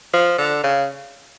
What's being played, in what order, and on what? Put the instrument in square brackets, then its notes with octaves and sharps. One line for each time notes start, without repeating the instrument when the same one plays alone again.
[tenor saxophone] F3
D3
C#3